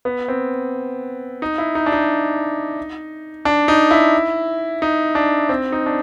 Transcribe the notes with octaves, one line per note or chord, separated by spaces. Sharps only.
B3
C4
D#4
E4
D#4
D4
D#4
D4
D#4
E4
D#4
D4
C4
D#4
D4